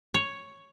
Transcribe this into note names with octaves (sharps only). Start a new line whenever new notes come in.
C#5